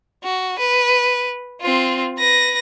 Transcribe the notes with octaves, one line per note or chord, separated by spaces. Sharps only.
F#4
B4
C4 F4
B4 A#6